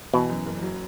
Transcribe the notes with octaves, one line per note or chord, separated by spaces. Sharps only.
B2 E3
F#2
F#1
F#3